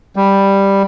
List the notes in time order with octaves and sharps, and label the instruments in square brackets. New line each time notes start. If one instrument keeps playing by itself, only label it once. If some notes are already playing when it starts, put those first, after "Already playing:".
[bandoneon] G3